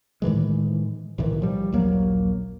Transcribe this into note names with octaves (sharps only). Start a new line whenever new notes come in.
A2 D#3 E3 G#3
B1 A2 D#3 E3
F3 G3
A#1 D#2 F#3 A#3